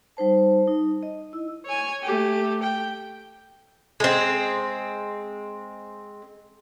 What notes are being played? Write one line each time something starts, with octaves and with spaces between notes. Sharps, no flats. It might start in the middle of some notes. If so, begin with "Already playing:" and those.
G3 D#4 C5 A5
D#4
D#5
E4 E6
C#5 G#5
A3 G4
G5
G#3 C4